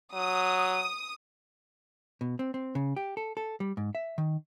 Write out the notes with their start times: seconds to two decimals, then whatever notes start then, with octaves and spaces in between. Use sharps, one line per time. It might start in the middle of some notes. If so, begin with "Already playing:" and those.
0.14 F#3 D#6
2.21 B2
2.39 C4
2.54 C4
2.75 C#3
2.97 G4
3.17 A4
3.37 A4
3.60 G3
3.77 G#2
3.95 E5
4.18 D#3